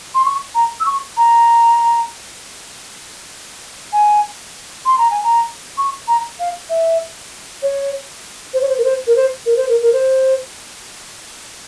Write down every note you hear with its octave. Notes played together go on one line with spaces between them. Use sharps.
C6
C#6
A#5
E6
C#6
A#5
G#5
C6
A#5
G#5
A#5
C#6
A#5
F5
E5
C#5
C5
C#5
C5
A#4
C5
A#4
C5
A#4
C5
A#4
A#4
C5